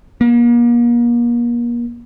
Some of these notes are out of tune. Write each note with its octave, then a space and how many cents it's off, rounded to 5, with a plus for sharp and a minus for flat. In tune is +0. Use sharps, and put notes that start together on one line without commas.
A#3 +35